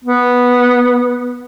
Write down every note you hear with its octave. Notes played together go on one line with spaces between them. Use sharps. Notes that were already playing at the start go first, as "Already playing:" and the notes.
B3